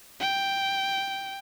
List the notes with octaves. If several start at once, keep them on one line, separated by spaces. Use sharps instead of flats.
G5